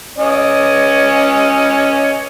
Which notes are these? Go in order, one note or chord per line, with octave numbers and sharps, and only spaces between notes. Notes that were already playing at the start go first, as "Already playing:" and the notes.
C#4 C#5 D#5